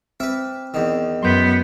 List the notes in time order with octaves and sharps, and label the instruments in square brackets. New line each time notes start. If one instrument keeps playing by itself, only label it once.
[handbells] C4 [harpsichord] B4 E5
[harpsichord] E2 D#3
[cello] F#2 B3 [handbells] C6 G6 B6